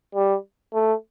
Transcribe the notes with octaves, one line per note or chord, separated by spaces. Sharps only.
G3
A3